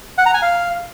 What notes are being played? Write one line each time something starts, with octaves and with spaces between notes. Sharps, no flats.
F#5
A#5
G#5
F5